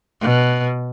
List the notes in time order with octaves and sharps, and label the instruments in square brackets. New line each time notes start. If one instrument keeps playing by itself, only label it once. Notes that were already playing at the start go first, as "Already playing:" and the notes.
[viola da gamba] B2